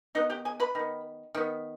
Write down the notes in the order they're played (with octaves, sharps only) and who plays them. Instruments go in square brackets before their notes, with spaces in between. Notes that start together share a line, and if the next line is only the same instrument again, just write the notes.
[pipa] D#3 B3 D#4 D#5
G4 G5
G#4 G#5
B4 B5
D#3 B3
D#3 B3